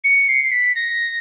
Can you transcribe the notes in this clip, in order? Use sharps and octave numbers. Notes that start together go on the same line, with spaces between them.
C#7
C7
B6
A#6